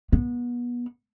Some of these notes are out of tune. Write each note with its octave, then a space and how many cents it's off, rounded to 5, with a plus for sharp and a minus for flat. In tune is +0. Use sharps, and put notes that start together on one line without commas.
B3 -30